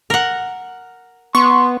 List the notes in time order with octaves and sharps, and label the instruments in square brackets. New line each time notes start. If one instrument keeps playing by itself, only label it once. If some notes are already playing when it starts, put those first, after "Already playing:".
[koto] A#4 F#5
[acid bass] B3 [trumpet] C6 [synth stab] C#6